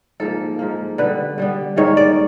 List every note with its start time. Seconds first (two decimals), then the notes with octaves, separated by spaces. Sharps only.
0.20 G#2 F3 A#3 A4
0.59 G#2 F3 A#3
0.98 D3 G3 B3 B4
1.38 D3 G3 B3
1.76 G#2 D#3 G3 A#3 C#5
1.97 D5